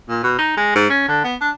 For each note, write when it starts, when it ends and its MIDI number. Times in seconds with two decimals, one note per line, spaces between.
0.09 0.22 46
0.23 0.34 47
0.38 0.54 63
0.57 0.74 56
0.75 0.90 44
0.90 1.05 61
1.09 1.22 50
1.24 1.35 59
1.41 1.50 62